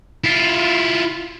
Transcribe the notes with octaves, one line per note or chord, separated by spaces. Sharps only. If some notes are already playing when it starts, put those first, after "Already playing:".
E4 F4